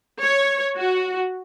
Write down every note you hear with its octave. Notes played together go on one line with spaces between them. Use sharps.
C#5
F#4